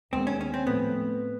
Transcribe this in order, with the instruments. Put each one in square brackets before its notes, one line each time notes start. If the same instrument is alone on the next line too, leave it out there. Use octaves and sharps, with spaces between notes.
[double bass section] D#2 D#3 G#3 B3 [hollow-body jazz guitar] C4
[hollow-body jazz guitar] C#4
C#4
C4
[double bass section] A2 F3 A3 C4 [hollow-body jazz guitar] B3